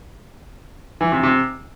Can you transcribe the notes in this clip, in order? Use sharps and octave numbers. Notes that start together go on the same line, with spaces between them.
E3
C3
C3